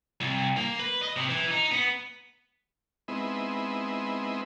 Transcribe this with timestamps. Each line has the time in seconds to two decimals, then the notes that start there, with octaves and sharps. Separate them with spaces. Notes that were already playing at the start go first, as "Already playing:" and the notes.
0.21 C2
0.57 A#3
0.80 B4
1.02 D#5
1.16 C3
1.29 E3
1.51 D#4
1.72 B3
3.08 G#3 B3 C4 D#4 E4